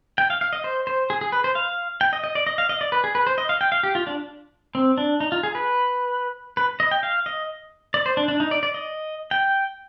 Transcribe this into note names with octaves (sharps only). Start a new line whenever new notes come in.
G5
F5
F5
D#5
C5
C5
G#4
G#4
B4
C5
F5
G5
D#5
D#5
D5
D#5
F5
D#5
D5
B4
G#4
B4
C5
D#5
F5
G5
F5
G4
F4
D4
C4
D4
D#4
F4
G#4
B4
B4
D#5
G5
F5
D#5
D5
C5
D4
D4
D#4
D5
D5
D#5
G5